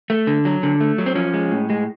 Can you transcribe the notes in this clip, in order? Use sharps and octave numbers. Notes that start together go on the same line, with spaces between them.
A3
D3
F#3
D3
A3
F#3
C4
F3 C#4
G#3
A2
G#3